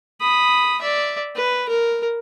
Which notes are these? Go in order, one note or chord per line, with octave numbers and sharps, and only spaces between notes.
B5 D#6
D5 E5
B4
A#4